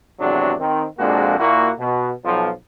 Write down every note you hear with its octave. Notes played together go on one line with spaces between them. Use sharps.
G#1 E2 C3 F#3 D4 F#4
D#3 C4
A#1 F2 G#3 A#3 D4 F#4
A#2 A#3 E4 F#4
B2
B1 F3